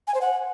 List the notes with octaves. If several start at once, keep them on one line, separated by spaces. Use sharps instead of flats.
G#5
C5
F#5